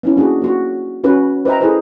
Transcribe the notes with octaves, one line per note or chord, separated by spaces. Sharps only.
B3 C#4 E4
A#3 D4 F#4 G#4
A#3 F#4
C#4 F#4 B4
B4 C5 D#5 E5 G5 A#5
E4 G#4 A4 B4 C5